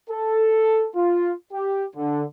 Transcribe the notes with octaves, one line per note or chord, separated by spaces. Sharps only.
A4
F4
G4
D3